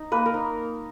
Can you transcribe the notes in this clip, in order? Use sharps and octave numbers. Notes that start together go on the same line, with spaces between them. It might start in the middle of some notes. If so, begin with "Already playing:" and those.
Already playing: D#4
A#3 B4
A#4
D#4